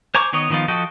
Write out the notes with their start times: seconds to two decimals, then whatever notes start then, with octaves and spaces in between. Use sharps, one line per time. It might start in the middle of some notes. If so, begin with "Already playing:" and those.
0.15 C5 G#5 A#5 C#6 D6
0.33 D#3 B3 C#5 D#5
0.50 D#3 F3 B3 D#4 F4
0.68 F3 F#4 A4 D#5 G5